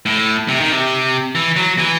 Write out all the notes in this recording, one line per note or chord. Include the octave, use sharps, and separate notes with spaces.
A2
C3
D#3
C3
E3
F#3
E3